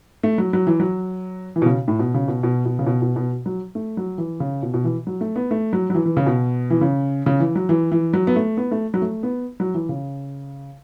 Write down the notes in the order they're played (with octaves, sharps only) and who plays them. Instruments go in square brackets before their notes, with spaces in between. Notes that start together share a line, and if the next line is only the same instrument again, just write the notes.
[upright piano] A3
F#3
F#3
E3
F#3
E3
B2
C#3
A2
B2
C#3
B2
B2
B2
C#3
B2
B2
B2
F#3
A3
F#3
E3
C#3
B2
B2
E3
F#3
A3
B3
A3
F#3
F#3
E3
E3
C#3
B2
E3
C#3
C#3
E3
F#3
E3
E3
F#3
B3
A3
B3
A3
F#3
A3
B3
F#3
E3
C#3